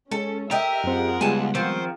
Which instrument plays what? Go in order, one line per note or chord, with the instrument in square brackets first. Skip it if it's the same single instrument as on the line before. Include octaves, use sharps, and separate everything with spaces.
[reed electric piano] G#3 [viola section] C#4 [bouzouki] A4
[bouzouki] G4 D#5 [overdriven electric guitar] A#4 [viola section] E5
[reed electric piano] F#2 C4 [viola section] F4 G#4 F#5
[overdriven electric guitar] C#2 [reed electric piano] G3 G#3 B3 [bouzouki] G#5 A5
[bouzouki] D#3 F3 C4 [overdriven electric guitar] C5